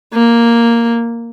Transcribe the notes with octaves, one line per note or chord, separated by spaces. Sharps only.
A#3